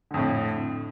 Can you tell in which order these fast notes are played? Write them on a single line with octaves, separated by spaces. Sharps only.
D3 F2 A2